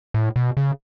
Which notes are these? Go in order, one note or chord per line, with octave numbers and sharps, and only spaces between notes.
A2
B2
C#3